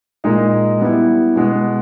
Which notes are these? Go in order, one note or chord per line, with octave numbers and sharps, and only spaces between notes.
A#2 G#3 D#4
G3 B3 E4
B2 G#3 B3